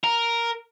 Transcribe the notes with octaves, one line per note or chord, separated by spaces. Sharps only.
A#4